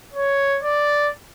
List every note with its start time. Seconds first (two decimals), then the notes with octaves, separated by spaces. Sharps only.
0.13 C#5
0.63 D5